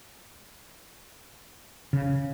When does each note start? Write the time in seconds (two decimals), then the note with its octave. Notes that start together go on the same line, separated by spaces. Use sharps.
1.93 C#3